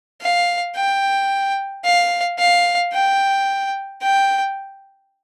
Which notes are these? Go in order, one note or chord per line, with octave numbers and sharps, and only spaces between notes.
F5
G5
F5
F5
G5
G5